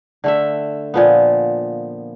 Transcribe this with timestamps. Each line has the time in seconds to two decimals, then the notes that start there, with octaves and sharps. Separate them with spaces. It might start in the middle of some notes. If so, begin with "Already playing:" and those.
0.24 D3 A3 E5
0.94 A#2 F3 B3